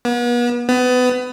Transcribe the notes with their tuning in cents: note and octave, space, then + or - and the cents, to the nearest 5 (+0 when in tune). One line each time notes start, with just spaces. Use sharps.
B3 -40
B3 +25